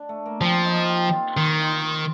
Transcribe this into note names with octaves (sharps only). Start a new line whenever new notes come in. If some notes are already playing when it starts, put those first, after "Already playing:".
Already playing: D4
A3
A#3
F3 C4
D#4
G4
F4
D#3 F4
F4
F4